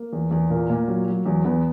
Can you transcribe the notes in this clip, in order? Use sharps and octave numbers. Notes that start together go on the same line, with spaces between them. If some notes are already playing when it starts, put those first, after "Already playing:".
Already playing: A#3
E2
E2
A#2 A#3
A#2
F#3
F#3
E2 F#3
E2 B3